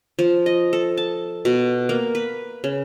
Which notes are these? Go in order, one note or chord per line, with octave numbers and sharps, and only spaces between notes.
F3
D#5
A4
A5
B2
A#3
B4
C#3